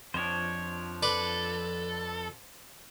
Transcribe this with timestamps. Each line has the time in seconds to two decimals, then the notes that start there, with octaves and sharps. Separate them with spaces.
0.14 F2 F3 D4 C5 C#5
1.03 A4 B4 D5